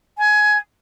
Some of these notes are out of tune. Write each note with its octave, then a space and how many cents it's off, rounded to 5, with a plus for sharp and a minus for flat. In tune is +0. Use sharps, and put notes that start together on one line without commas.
G#5 +20